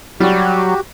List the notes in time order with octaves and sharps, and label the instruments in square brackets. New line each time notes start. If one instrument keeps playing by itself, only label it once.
[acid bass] F#3 [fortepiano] G3 [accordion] F#4 G4